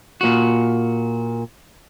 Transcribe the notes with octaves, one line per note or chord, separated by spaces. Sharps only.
A#2 F#4